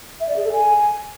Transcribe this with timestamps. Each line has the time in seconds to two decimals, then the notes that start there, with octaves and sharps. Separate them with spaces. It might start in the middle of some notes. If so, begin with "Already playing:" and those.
0.20 E5
0.28 D5
0.36 G#4
0.45 A4
0.53 G#5